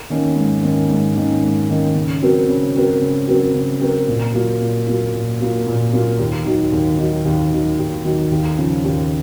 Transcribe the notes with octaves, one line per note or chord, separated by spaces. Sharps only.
D#3 A#3 C#4
G#2
D#3 A#3 C#4
G#2
D#3 A#3 C#4
G#2
D#3 A#3 C#4
C#3
F#3 C4 F#4 A#4
C#3
F#3 C4 F#4 A#4
C#3
F#3 C4 F#4 A#4
C#3
F#3 C4 F#4 A#4
A#2
F#3 A#3 F4
A#2
F#3 A#3 F4
A#2
F#3 A#3 F4
A#2
F#3 A#3 F4
D#2
D#3 F#3
D#2
D#3 F#3
D#2
D#3 F#3
D#2
D#3 F#3
D#2
C#3 F3
D#2